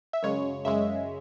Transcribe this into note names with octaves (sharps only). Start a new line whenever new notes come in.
E5
F#2 C#3 G#3 C#5
F#2 C#3 G#3 E5